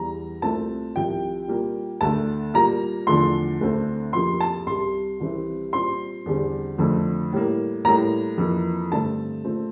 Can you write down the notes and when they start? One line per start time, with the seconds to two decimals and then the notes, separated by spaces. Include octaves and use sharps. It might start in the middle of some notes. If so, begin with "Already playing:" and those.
Already playing: E2 E3 G3 A#5
0.42 C2 A#2 A3 C4 A5
0.96 C2 C3 F3 G5
1.48 A#2 G3 A#3
2.01 D2 D3 A3 A5
2.54 A#2 G3 A#3 A#5
3.07 E2 D3 F3 A3 C6
3.61 D2 D3 A3 C4
4.13 F2 C3 F3 A#3 C6
4.40 A5
4.66 C2 C3 G3 C6
5.20 C2 C3 E3 G3 C4
5.73 A#2 G3 C4 C6
6.26 E2 D3 G3 C4
6.78 F2 D3 A3 C4
7.33 A2 G3 A#3
7.85 A2 G3 A#3 A#5
8.38 F2 E3 A#3
8.91 G2 D3 A3 C4 A5
9.45 A#2 A3 C4